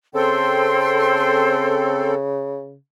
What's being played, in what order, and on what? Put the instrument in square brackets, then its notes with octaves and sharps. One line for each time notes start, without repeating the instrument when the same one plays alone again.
[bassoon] C#3 [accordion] C4 A4 [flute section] C5 G5 C6